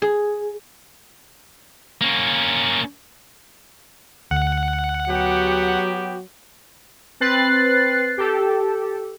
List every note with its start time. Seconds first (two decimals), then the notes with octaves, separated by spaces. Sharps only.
0.02 G#4
2.01 A#3 C#4
4.31 D2 F#5
5.09 F#3 B3 F#4 G4
7.20 C4 B4 F#6 A6 C7
8.17 G4 A4